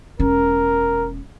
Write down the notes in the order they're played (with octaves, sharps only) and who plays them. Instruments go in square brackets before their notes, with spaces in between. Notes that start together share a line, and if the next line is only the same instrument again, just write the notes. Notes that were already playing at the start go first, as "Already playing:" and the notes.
[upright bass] E1 C#4 [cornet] A#4